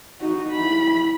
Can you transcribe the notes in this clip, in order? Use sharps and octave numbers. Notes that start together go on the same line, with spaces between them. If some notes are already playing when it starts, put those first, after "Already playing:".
D#4 F#4
E4 B5